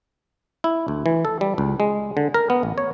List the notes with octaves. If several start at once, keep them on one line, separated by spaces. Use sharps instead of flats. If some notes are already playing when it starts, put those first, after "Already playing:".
E4
D2
E3
A4
G3
C#2
G#3
D3
A#4
B3
A1
C#5